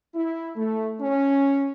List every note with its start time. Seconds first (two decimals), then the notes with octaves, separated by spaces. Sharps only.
0.15 E4
0.56 A3
1.01 C#4